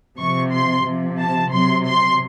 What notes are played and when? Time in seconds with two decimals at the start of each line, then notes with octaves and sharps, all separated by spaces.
0.19 C3 F3 C#6
0.52 C6
0.86 C3 F3
1.19 A5
1.53 C3 F#3 C6
1.86 C6